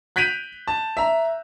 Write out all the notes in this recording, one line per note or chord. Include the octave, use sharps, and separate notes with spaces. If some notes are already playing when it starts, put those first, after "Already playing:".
F#6 G6 B6 D7 D#7 F7
A5
E5 A#5